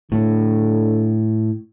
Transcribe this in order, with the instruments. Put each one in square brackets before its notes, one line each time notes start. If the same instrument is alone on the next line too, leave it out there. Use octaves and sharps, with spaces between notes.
[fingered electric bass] A2 [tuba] D3